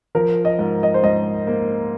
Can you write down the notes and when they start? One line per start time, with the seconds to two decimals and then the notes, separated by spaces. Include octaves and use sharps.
0.15 F3 A#4
0.45 D#5
0.59 G#2
0.83 D#5
0.94 C5
1.03 G#2 D#5
1.47 A#3